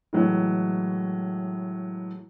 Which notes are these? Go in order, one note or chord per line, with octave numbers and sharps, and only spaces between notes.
A2 E3 F#3 G#3